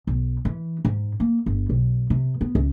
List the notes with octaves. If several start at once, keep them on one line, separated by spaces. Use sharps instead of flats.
B1
E3
G#2
A#3
G1
B1
C3
B3
C#2